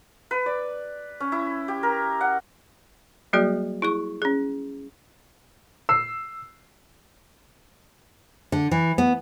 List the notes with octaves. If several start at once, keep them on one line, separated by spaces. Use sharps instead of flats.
B4
D5
C#4
E4
G4
A#4
F#5
F#3 G3 A#3 F#4 G#4 D5
E4 G#4 C#6
C#4 G#4
E6 C7
D3
E3
B3